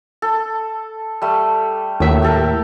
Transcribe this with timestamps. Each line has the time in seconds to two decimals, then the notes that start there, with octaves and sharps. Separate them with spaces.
0.22 A4
1.22 G3 A3
2.00 D#2 A2 F#3 E5
2.22 G4 A4 A#4